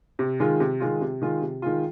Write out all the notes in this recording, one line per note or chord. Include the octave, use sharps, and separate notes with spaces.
C3
D#3 G#3 F4
C3
D#3 G#3 F4
C3
D#3 G#3 F4
C3
D#3 G#3 F4